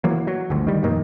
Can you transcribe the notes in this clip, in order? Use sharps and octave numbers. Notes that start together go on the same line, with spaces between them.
E3 F#3 A#3
F#3
G1 D2
D#3 G3
F2 A#2 D#3 A#3